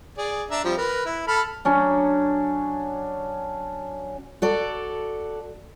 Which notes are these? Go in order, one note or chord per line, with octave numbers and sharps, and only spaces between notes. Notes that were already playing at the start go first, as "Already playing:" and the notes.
G#4 D5
D4 E5 A#5
F3 G3 C4
A#4 B4
E4
A4 B5 F6
F#3 C#4 D4
F#4 A4 D5